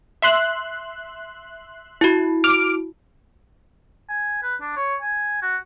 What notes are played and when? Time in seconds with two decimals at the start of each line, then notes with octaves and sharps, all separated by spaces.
0.22 E5 C6 F#6
2.01 E4 F#4
2.44 D6 F6 D7
4.09 G#5
4.43 B4
4.61 D4
4.77 C#5
5.02 G#5
5.42 F#4